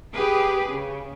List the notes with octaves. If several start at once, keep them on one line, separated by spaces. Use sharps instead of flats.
G4 G#4 B4
C#3